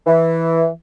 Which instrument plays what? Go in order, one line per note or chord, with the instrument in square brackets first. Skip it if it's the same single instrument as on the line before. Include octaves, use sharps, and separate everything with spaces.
[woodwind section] E3